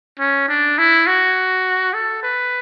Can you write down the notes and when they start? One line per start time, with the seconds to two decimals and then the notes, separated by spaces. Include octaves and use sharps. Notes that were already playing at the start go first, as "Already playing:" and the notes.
0.19 C#4
0.48 D4
0.78 E4
1.07 F#4
1.94 A4
2.23 B4